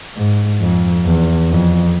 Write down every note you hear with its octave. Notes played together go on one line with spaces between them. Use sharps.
G#2
F2
E2
F2